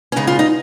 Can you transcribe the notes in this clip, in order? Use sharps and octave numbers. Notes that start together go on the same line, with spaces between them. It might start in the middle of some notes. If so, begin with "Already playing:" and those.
C#4
C#3 G#3 B3 D#4
F4
D#4